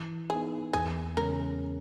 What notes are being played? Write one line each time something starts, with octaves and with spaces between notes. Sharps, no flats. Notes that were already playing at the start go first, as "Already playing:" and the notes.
Already playing: E3
B3 D#4 G#4
E2 G#4
C#3 G#3 C#4 A#4